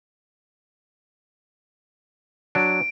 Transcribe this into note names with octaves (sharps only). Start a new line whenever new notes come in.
F#3 D4 D7